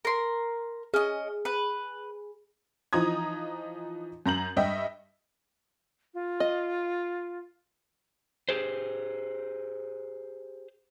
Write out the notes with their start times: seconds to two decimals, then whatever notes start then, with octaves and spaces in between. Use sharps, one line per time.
0.05 A#4 C6
0.94 C#4 G#4 D#5
1.45 B4
2.93 E3 F3 D#4 A#5 D#6 G#6
4.26 F#2 A#5 G6 F#7
4.57 G2 D#5 E5 G5
6.14 F4
6.40 D#5
8.49 G4 G#4 C5